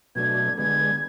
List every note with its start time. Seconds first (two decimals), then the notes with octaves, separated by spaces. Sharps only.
0.15 B2 F#3 A3 D4 G#6
0.58 D3 G#3 B3 G#6